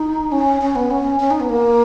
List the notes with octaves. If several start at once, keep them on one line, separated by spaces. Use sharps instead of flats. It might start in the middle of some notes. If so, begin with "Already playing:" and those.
Already playing: D#4
C#4
C#4
B3
C#4
C#4
D#4
B3
A#3